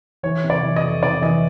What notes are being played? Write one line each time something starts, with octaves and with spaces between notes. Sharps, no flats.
E3 C#5
C3
D5
E3
D#5
F2
C3 D5
E3 D#5